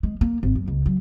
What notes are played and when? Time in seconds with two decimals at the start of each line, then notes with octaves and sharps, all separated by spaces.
0.03 G#3
0.21 A#3
0.43 G#1
0.55 F#2
0.68 C#2
0.86 F#3